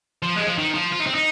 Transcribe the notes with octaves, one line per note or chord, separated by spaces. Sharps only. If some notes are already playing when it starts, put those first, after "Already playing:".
F3
G#3
F3
D#3
F3
F4
D#4
C4
D#4